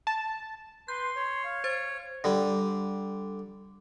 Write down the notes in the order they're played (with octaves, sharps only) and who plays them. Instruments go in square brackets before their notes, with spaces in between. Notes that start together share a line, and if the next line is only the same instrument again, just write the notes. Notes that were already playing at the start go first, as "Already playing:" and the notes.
[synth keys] A5
[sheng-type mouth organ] B4 [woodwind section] C6 [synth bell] G6
[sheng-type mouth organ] C#5
[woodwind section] F5
[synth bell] C5 A6
[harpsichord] D3 G3